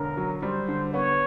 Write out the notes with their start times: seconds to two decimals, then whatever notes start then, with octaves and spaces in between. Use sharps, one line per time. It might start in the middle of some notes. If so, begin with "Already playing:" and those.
Already playing: E1 D3 A#4
0.17 F#3
0.42 G3 C5
0.68 D3
0.93 B3 C#5